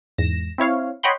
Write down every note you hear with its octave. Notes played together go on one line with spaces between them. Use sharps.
E2 G#2 A#6 E7
C4 E4 C#5 F5
C#5 D#5 F#5 G5 B5 C6